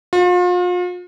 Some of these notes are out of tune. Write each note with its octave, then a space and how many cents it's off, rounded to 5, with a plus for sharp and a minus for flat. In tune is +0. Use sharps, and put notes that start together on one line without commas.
F4 +40